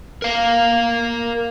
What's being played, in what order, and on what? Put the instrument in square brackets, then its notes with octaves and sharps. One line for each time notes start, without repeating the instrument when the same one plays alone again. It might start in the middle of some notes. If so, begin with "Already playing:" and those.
[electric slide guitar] A#4 F5